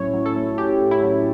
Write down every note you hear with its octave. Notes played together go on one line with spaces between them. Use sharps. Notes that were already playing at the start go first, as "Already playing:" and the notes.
Already playing: A2 F#3 A3 C#4 E4 C#5
F#3
A4
A3
C#4 G4
A2
E4
F#3